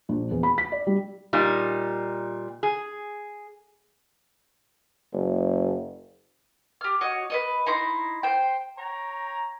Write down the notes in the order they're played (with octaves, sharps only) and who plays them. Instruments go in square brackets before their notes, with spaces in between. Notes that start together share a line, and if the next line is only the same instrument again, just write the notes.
[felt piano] A#1
E2
B5
B6
D5
G3
[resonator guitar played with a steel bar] A#2 G3 D#4
G#4
[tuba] F#1
[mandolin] G4 F6
F#4 C#5 D#5
B4 C#5 D#5
D#4 E4 A#5 C6
C5 G5
[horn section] C#5 G5 A#5